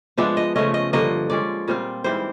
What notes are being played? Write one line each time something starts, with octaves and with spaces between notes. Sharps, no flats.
F3 G#3 B3 D4 E5
D#5
C#3 F3 A3 C#4 D#5
D#5
G2 D3 F3 A#3 D#5
F3 G#3 C#4 D5
A#2 G3 C4 F4
G#2 E3 G3 C5